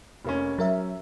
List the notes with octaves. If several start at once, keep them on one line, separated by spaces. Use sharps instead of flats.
F1 A#3 C#4
F#3 C#4 A#4 E5